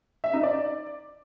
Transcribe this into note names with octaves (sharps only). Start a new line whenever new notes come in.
E5
D#4
D5